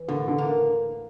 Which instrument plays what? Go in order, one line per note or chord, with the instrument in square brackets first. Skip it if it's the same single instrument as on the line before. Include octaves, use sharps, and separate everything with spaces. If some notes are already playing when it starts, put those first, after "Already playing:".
Already playing: [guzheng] E3
[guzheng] A2 [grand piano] D3
[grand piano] D3
[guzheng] A#3